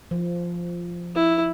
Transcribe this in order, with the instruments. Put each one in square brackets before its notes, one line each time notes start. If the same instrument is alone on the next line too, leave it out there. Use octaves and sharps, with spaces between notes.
[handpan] F3
[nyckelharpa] E4